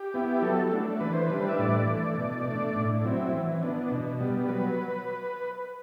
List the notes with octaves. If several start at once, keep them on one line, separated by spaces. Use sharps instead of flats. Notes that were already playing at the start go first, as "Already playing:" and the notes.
Already playing: G4
B3 E4
F#3 A4
A3 D4
E3 B4
C5
G3 D4 B4
E5
A2 D5
E3 A3
B2
A3 D4
A2
F#3 C4 E4
E3
B3 D4
B2
G3 B3
F#3 B4